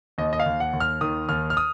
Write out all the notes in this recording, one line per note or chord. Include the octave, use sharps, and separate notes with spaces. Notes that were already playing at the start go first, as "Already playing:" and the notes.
D#2 D#5
D#5
F5
D#2
F#5
D#2
F6
D#3 D#6
D#2 F6
F6
D#6